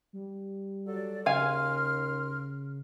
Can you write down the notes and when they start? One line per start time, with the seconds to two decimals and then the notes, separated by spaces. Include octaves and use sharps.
0.13 G3
0.87 F#3 A4 D5
1.26 D#2 C#3 F5 G#5 C6 F6